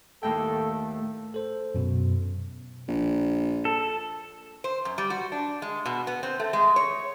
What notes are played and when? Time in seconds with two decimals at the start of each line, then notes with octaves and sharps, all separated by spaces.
0.23 D#2 A2 A4 G5
1.34 A4 C5
1.75 F#2 B2
2.89 A#1
3.65 A4
4.64 C5
4.85 F#2
4.98 G3
5.10 F#4
5.32 D4
5.62 G#3
5.86 B2
6.07 B3
6.23 C4
6.40 A3
6.53 G#3
6.76 C#5